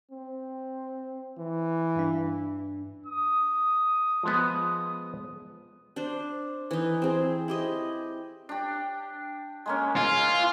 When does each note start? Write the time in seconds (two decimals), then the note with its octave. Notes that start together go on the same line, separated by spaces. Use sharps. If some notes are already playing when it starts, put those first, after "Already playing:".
0.11 C4
1.38 E3
1.96 G2 D4
3.06 D#6
4.23 F3 G#3 B3
5.96 D4 C5
6.71 E3 D#4
7.02 C4 G#4
7.48 E4 G4 D#5
8.49 D4 G4
9.66 G#3 A#3 C#4
9.97 G#3 F4